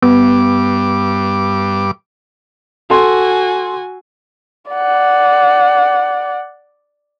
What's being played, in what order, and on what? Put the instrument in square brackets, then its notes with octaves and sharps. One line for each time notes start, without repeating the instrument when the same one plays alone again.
[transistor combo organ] G2 D6 [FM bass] B3
[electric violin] F#4 G#5 [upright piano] A4 C6
[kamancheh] D5 F#5